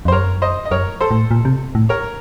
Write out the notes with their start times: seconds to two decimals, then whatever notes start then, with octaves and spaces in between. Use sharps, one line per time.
0.05 F2
0.08 C5
0.12 F#2 A#4 C#5
0.42 C5 D#5
0.65 D#5
0.71 F#2 A#4 C#5
1.01 A4 C5
1.11 A2
1.31 A#2
1.45 C3
1.75 A2
1.89 A#4 C#5